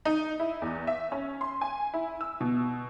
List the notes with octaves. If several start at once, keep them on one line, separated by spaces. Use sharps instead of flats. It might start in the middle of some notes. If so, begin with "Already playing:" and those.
D#4
E4
E2
E5
C#4
C6
G#5
E4
E6
B2